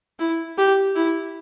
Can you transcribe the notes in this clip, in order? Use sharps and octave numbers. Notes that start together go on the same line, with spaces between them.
E4
G4
E4